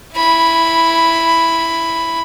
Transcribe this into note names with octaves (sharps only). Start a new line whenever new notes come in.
E4 B5